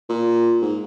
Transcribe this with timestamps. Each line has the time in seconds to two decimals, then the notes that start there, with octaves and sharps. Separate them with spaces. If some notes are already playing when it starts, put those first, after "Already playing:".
0.09 A#2
0.62 G#2